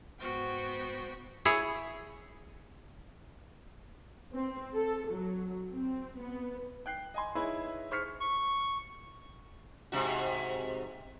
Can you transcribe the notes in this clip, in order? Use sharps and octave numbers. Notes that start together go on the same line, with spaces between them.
G#2 B3 F#4 C5 G5
E4 G#4 C#5
C4
A4
F#3
C4
B3
G5 F#6 C7
D#5 G#5 C6
D#4 E4 G#4 B4 C#5 E5
G#4 C5 C#6 F6 B6 C#7
C#6
G#2 C3 F#4